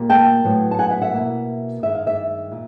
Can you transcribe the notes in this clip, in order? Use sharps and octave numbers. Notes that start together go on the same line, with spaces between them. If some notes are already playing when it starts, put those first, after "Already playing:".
Already playing: A#2 G3 A#3
G5 A5
A2 F#3 B3
A5
F#5 G#5
E5 F#5
E5 F#5
B2 F#3 A#3
G2 D#3 G#3 E5
F5
D5 E5
A#2